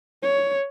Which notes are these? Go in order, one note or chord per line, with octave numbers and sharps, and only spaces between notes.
C#5